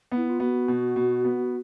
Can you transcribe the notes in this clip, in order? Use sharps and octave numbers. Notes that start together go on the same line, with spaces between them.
B3 E4
F4
B3 F#4
B2
B2
B3